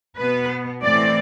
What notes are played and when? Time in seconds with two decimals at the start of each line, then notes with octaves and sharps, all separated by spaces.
0.17 B2 B3 B4
0.82 A2 E3 A3 C4 D5